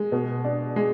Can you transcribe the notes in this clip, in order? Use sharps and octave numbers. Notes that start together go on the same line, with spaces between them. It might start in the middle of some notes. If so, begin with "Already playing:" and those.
Already playing: G#3
B2
D4
G#3